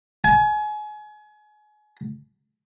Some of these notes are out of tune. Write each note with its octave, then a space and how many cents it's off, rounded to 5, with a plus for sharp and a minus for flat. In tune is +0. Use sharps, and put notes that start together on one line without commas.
G#5 +30